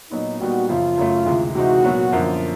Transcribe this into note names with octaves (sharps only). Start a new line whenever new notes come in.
A#2 F#3 B3 D#4
A#2 G3 B3 D#4 F#4
F#2 C#3 F3 F4
F#2 C#3 F#3 A3
D2 C3 E3 G#3
C3 E3 G#3 C4 D#4 F#4
A#2 F#3 B3
F#2 D3 F3 A#3